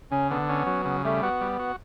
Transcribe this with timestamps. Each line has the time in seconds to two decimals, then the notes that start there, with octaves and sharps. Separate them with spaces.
0.11 C#3 C#4
0.30 D3 B3
0.49 C#4
0.66 F#3
0.85 C#3
1.04 G3 A3
1.22 B3 F#4
1.41 G3
1.59 F#4